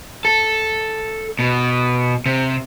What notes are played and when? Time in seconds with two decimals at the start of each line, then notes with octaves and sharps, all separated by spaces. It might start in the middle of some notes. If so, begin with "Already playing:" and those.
0.25 A4
1.39 B2
2.26 C3